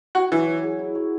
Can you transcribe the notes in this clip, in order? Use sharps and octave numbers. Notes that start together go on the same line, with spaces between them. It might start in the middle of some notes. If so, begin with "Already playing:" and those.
E4 F#4
E3 F#3
F#3
G#4
E4
F#3